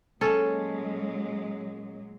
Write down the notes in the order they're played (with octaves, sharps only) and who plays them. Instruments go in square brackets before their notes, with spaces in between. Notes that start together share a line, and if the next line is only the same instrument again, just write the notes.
[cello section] A#2 F#3 G#3 [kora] C#4 A4